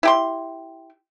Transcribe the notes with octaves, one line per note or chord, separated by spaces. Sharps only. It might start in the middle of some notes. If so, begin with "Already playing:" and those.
E4 G4 C6